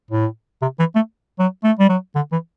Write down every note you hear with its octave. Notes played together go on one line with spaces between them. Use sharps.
A2
C3
E3
A3
F#3
A3
G3
F#3
D3
E3